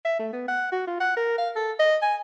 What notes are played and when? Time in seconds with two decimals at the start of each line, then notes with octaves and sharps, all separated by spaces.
0.05 E5
0.20 A3
0.33 B3
0.48 F#5
0.72 F#4
0.87 F4
1.00 F#5
1.16 A#4
1.38 F5
1.56 A4
1.79 D#5
2.02 G#5